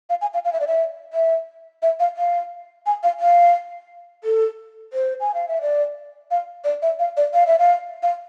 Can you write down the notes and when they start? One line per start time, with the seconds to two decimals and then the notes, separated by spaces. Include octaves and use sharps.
0.10 F5
0.21 G#5
0.34 F5
0.45 F5
0.53 E5
0.60 D5
0.67 E5
1.13 E5
1.82 E5
2.00 F5
2.17 F5
2.86 G#5
3.03 F5
3.20 F5
4.24 A4
4.93 C5
5.20 G#5
5.34 F5
5.48 E5
5.61 D5
6.31 F5
6.64 D5
6.82 E5
6.99 F5
7.17 D5
7.34 F5
7.46 E5
7.59 F5
8.02 F5